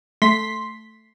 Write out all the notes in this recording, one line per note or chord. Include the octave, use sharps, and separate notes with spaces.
A3 C6 B6